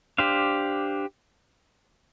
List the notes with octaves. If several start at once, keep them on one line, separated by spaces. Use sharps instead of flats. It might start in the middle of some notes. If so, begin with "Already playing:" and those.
D4 G4 C5 F5